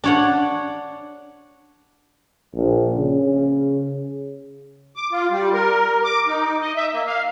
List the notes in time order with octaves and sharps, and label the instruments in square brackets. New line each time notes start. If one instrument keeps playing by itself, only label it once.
[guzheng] D4 C#5 F#5
[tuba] A#1
C#3
[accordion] D6
F4
G3
A#4
D6
D#4
D#5
E5
A#3
F5